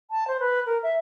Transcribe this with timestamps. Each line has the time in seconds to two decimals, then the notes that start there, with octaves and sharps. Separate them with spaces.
0.11 A5
0.27 C5
0.40 B4
0.66 A#4
0.83 E5